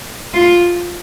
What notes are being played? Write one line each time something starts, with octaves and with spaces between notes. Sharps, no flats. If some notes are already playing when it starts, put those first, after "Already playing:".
F4